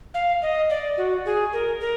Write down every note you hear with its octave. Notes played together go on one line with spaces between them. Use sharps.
F5
D#5
D5
F#4
G#4
A#4
A#4